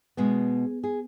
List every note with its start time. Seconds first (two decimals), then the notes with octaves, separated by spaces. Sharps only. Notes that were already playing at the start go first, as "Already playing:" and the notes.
0.17 B2 G#3 B3 G#4
0.84 G#4